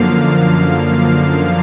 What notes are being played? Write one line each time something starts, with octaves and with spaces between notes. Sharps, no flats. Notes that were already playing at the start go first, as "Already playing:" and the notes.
Already playing: F#2 D3 F3 A#3 F5